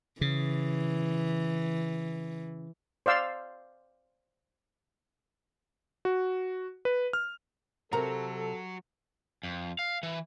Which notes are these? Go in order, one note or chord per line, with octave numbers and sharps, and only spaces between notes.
C#3 E3
C5 D5 F5 E6
F#4
B4
F6
C3 F#3 F#4 A4 A#4 A#5
F2
F5
E3